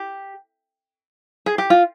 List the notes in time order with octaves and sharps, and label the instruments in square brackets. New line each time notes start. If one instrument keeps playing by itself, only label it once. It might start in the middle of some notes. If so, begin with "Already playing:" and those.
Already playing: [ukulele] G4
G#4
G4
F4